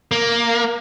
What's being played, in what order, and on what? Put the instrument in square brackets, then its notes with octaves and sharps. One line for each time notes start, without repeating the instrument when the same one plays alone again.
[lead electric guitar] A#3